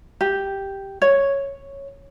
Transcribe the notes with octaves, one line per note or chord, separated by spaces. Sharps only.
G4
C#5